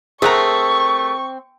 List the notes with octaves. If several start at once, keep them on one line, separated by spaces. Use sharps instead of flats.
A3 C4 G#4 A#4 F#5 A#5 C#6